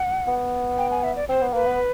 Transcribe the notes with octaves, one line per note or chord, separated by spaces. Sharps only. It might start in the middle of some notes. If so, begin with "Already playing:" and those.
Already playing: F#5
B3
G5
G#5
E5
D5
C4 C5
B3
A#3 B4
B3